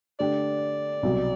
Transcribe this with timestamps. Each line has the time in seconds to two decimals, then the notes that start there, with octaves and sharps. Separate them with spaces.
0.20 D3 A3 D4 G4 D5
1.03 C2 B2 F#3